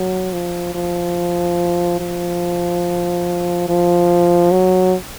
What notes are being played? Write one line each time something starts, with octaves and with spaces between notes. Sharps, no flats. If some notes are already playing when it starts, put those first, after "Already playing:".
Already playing: F#3
F3
F3
F3
F3
F#3